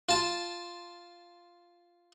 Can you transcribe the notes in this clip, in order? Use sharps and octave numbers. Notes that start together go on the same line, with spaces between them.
F4 A5